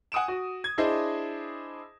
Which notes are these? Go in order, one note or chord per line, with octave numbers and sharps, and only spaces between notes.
F#5 G#5 D#6 D7 E7
F#4
G#6
D4 E4 G#4 C5 D#5